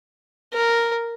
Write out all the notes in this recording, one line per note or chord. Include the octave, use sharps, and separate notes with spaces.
A#4